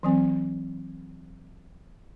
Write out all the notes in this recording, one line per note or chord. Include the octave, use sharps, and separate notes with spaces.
E3 F#3 C4